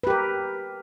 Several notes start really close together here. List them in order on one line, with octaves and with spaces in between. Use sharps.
B4 G4 A#4